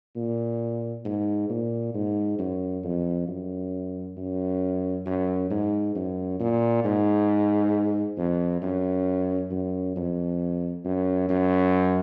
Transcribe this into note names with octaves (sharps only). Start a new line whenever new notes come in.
A#2
G#2
A#2
G#2
F#2
F2
F#2
F#2
F#2
G#2
F#2
A#2
G#2
F2
F#2
F#2
F2
F#2
F#2